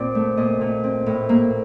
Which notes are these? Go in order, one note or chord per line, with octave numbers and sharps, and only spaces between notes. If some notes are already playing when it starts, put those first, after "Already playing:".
Already playing: A#2 C4 D5
A3
A#2 D#5
A#2
C4
A2
A#3